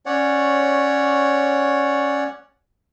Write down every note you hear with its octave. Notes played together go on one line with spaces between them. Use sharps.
C#4 C#5 D5 F#5